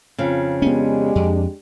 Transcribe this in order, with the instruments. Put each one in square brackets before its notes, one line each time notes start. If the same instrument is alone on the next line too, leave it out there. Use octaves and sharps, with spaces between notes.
[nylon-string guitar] F2 C#3
[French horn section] G#3 D4 G4 [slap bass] B3 C#4
[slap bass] F2